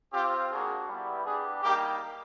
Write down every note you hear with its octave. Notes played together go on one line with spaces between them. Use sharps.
C4 F4 G4
A#3 D4 F#4 G#4
G3 B3 E4
B3 D4 G4 G#4
G3 A#3 D#4 G4